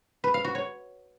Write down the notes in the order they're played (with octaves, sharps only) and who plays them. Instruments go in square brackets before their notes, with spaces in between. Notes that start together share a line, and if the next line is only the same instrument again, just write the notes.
[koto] B4
F5
F#4
C#5